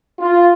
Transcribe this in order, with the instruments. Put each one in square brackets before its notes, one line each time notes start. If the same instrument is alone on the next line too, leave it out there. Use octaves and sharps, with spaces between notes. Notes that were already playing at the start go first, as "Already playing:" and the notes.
[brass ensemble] F4